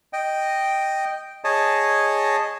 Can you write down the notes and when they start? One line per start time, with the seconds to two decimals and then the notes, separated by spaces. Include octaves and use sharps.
0.13 D#5 G5
1.44 G#4 C#5 D#5 A5